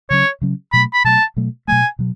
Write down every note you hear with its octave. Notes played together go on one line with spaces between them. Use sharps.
C#3 F#3 C#4 C#5
C#3 F#3 C#4
B2 F#3 A3 B5
B5
B2 F#3 A3 A5
B2 F#3 A3
B2 F#3 A3 G#5
B2 F#3